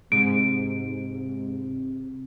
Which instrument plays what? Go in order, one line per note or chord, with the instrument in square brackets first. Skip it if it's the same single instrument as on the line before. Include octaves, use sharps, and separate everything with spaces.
[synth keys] G#2 [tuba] C3 [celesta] D7